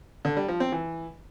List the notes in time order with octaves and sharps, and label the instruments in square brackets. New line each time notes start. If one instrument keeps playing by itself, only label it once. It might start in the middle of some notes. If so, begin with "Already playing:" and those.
[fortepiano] D3
G3
F3
C4
E3